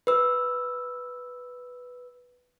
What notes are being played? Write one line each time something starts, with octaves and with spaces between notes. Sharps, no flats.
B4 E6